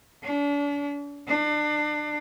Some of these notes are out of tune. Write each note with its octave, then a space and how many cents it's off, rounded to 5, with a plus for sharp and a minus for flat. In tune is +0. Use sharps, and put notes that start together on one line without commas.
D4 -40
D4 +30